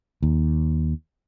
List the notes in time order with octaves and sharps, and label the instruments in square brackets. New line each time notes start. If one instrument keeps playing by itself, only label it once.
[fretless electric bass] D#2